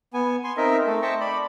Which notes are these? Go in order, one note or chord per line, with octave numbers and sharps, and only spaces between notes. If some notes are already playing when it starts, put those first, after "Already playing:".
B3 G#5
G#5 C6
C4 D#4 A#4 D#5 E5
A3 A4
C5 D#5 E5 G5 A5 C#6
D5 B5